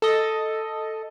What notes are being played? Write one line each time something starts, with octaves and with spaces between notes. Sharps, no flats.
A4 D#5